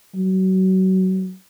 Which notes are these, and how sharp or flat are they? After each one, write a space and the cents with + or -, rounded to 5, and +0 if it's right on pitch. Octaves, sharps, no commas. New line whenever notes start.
F#3 +25